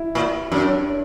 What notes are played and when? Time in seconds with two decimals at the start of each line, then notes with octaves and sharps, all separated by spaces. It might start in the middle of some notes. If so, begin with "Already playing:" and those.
Already playing: E4
0.15 A#2
0.52 F#2 D4